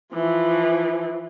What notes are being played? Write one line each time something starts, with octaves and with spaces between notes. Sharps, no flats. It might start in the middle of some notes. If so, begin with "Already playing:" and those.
E3 F3